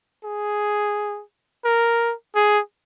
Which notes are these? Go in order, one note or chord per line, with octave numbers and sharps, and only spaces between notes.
G#4
A#4
G#4